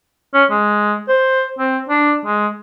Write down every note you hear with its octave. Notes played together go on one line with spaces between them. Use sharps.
C#4
G#3
C5
C4
D4
G#3